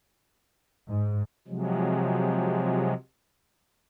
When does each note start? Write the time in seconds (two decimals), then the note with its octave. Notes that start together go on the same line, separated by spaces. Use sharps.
0.89 G#2
1.48 C3 F3 F#3 G#3